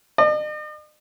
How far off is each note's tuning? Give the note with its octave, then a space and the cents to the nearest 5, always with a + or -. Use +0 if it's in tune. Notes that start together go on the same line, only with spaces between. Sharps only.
D#5 -45